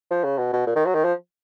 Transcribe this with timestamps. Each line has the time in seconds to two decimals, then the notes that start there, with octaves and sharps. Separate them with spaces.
0.11 F3
0.24 C#3
0.38 B2
0.53 B2
0.67 A#2
0.76 D#3
0.86 F#3
0.94 D#3
1.04 F3